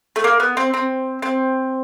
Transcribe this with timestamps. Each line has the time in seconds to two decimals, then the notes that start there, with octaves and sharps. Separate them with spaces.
0.16 A3
0.24 A#3
0.40 B3
0.57 C4
0.74 C4
1.22 C4